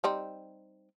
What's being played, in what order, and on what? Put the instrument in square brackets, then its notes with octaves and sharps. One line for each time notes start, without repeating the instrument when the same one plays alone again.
[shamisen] G3 C4 D#4